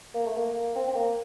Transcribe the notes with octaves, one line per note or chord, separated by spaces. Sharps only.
A#3
A3
A#3
C4
C4
A#3